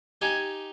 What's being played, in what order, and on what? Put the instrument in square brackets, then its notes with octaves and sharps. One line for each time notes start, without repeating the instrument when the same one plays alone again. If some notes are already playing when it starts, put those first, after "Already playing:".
[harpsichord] D#4 G4 [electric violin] G#5